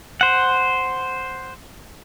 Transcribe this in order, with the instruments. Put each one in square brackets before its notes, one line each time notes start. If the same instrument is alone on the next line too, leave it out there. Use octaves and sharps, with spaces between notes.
[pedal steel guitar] C5 F#5